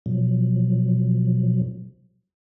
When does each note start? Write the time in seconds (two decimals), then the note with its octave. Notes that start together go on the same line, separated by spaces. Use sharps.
0.06 B2 F3 F#3